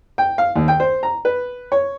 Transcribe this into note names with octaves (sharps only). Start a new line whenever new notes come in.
G5
F5
D#2
G5
C5
A#5
B4
C#5